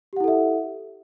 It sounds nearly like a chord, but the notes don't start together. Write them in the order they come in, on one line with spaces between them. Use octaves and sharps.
G4 F#5 E4 A4 E5